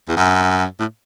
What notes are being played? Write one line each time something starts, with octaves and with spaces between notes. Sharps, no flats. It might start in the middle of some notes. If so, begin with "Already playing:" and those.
E2
F#2
A2